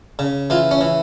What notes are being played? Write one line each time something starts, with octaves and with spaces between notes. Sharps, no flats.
C#3
E3 F4
C#4
E3